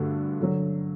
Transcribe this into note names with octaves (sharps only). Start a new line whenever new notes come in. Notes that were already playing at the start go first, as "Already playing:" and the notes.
Already playing: G2 D3 A3 D4 F#4
D3 F#3